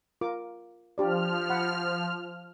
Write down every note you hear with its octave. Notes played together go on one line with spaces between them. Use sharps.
F4 A#4 D6
F3 D4 G4 D5 F6
F#5 B5